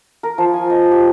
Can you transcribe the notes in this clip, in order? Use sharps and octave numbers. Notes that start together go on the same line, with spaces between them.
A#4
F3
G#5
D#5
G4